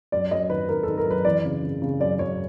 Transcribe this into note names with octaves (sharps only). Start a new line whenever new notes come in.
F#2 D5
F#2 D#5
D#3 B4
D#3 A#4
D#3 A4
A#4
F#2 B4
E3 D5
C#3
C#3
C#3
F#2 D5
F#2 C#5